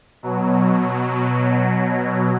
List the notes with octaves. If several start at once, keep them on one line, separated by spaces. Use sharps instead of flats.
B2 F#3